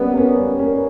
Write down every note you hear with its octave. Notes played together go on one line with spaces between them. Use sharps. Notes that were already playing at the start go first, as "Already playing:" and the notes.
Already playing: G3 A#3 B3 C#4
A#3 C#4
G3
A#3 C#4